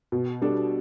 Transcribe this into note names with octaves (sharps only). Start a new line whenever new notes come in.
B2
G3 D4 A4